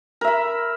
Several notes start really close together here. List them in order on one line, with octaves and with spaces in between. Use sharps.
A#4 E5 B5